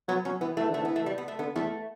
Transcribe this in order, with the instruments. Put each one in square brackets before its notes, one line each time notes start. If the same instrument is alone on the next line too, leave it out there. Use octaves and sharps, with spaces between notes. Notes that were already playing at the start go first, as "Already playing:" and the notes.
[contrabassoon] F#3 [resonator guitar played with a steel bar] B3
[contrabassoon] F#3 [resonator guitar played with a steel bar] C#4
[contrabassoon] E3 [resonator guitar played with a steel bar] B3
[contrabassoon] E3 [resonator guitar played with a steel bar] A3
[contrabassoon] D3 [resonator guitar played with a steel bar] A3
[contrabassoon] E3 [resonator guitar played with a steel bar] B3
[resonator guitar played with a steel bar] A3
G3
B3
A3
[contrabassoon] D3 [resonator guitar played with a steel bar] B3
[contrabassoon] E2 [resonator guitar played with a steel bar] A3